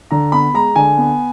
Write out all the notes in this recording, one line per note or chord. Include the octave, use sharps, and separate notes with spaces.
D3 A#5
B3 B5
G#3 A#5
D3 G#5
B3